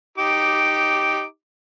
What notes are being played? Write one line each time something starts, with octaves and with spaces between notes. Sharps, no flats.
D#4 G4 D6